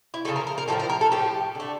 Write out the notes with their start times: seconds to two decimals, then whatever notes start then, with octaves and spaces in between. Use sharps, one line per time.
0.14 E4
0.25 C#3 F3 A3 A4
0.36 A#4
0.47 A#4
0.58 A#4
0.68 A2 F3 A3 A4
0.80 A#4
0.90 A#4
1.01 A4
1.12 A2 F3 A3 G4
1.55 D3 A3